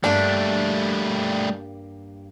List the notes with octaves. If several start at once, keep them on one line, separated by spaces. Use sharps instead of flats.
G2 G3 A3 A#3 D4 G4